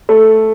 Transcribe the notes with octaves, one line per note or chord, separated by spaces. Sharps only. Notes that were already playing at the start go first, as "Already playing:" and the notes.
A3